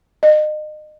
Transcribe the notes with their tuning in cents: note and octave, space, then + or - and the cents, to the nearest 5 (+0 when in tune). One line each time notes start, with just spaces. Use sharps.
D#5 -35